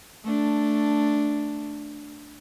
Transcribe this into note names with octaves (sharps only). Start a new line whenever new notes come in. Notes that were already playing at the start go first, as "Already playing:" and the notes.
A3 D4